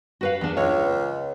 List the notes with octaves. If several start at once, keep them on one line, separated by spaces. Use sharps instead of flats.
F#4 B4 F5
E2 D4
C#2 C#5